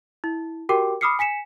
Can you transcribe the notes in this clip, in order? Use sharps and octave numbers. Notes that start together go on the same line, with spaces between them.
E4
F#4 G4 A#4 G5 D6
B5 D6 D#6 F6 C7 C#7
G#5 B6 C#7 E7